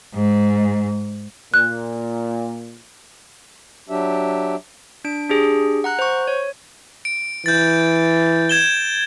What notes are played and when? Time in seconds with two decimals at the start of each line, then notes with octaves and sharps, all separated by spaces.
0.15 G#2
1.54 A#2 F#6
3.89 F#3 D4 G4 E5
5.05 D4 D7
5.29 D4 G4 G#4
5.84 F#5 A#5 F#6
5.99 C5 C#6
6.28 C#5
7.05 D7
7.46 E3 G6 A6
8.49 G#6 E7 G7